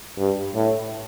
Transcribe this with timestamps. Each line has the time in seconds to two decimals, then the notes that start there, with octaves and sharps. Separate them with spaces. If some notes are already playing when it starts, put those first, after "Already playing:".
0.18 G2
0.55 A2